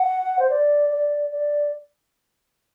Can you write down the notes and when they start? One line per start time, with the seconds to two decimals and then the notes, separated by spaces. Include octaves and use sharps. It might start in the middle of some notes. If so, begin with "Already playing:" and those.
Already playing: F#5
0.39 C5
0.50 D5
0.90 D5
1.31 D5